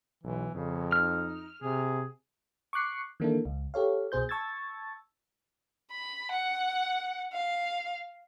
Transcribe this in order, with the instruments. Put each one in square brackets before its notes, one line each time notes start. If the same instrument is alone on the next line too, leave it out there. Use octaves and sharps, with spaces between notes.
[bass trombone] B1 [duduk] E3
[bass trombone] F2 [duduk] C#3
[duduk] D#4 [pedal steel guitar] F6
[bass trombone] C3 [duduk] G#4
[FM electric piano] C#6 D6 F#6 C7 C#7
D#3 E3 A#3 D4 E4 A4
C#2
G4 A4 C#5 F5
C2 B2 G#4 C5 G6
A5 C#6 E6 G#6 A6
[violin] B5
F#5
F5